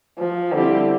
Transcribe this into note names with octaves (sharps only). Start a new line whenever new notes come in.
F3
D3 G3 C4 E4 G4